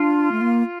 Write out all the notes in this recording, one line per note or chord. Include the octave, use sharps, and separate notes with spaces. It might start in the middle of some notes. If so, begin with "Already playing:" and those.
Already playing: D4 F4
A3
A#3